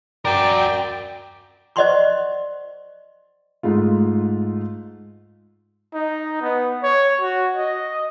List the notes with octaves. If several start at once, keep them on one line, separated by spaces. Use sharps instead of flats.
F#4 A#4 D5 G5
C5 D5 D#5 F#5 C6 C#6
G#2 G#3 A3 F4
D#4
B3
C#5
F#4
D#5